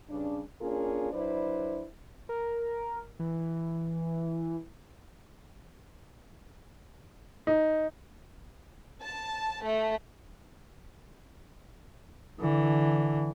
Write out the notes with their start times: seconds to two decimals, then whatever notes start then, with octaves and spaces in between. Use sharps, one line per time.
0.10 G2 C#3 D4
0.62 A#3 C#4 D4 F4 G#4 A#4
1.13 F#3 D4 E4 B4 C5 D5
2.29 A#4
3.19 E3
7.47 D#4
9.04 A5
9.64 A3
12.41 D3 E3